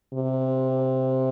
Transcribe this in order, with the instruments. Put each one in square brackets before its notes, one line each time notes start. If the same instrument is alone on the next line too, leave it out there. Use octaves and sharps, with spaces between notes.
[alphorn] C3